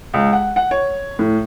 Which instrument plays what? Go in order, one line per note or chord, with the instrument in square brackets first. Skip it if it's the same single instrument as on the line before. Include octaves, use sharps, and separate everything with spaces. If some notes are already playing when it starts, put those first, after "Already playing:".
[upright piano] C#2
F#5
F#5
C#5
A2